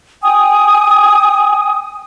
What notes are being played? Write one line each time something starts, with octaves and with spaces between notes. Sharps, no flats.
G5 G#5 D#6